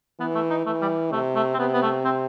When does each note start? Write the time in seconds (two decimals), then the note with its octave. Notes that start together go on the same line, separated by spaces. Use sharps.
0.19 E3 B3
0.35 A3
0.50 D#4
0.66 E3 A3
0.82 G3
1.12 C3 A3
1.35 A3
1.54 C4
1.59 C3 B3
1.73 B3
1.82 A3
2.05 C4